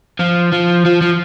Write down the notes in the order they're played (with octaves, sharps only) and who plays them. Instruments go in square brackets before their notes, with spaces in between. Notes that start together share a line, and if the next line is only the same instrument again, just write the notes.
[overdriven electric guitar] F3
F3
F3
F3